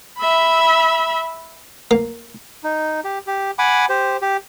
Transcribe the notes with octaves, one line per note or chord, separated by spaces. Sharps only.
E5 B5
A#3
D#4
G4
G4
F#5 G#5 B5 D6
G4 C5
G4